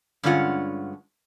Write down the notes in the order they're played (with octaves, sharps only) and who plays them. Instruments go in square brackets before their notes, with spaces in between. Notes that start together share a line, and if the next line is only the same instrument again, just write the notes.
[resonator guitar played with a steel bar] G2 D3 G#3 C#4 F4 F#5